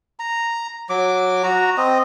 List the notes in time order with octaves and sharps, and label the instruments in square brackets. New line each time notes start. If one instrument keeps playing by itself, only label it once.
[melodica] A#5
F#3 D6
F#4 A#5
C4 D#5